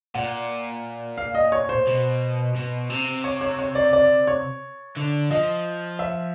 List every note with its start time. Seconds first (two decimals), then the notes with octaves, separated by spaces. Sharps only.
0.15 A#2 F#5
1.18 F5
1.35 D#5
1.52 C#5
1.69 C5
1.87 B2
2.55 B2
2.89 C3
3.24 C#5
3.41 C#5
3.59 C#5
3.75 D5
3.93 D5
4.27 C#5
4.96 D3
5.30 F3 D#5
5.99 E5